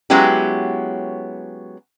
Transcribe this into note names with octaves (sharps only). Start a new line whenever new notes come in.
F#3 G#3 B3 C#4 E4 G4